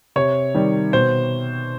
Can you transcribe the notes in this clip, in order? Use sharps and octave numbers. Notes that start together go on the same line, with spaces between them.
C3 C#5
D#3 G3
B2 C5